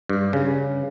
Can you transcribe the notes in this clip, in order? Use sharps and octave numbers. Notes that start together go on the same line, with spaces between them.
G2
C#3